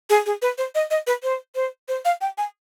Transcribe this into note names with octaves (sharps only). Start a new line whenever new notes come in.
G#4
G#4
B4
C5
D#5
D#5
B4
C5
C5
C5
F5
G5
G#5